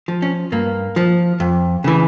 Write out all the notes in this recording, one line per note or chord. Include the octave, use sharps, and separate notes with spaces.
F3
C#4
G2 A#3
F3
F2
C#3 E3